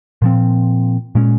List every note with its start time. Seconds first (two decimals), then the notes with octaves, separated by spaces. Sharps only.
0.22 A#2 F3 C4
1.15 A#2 G#3 C#4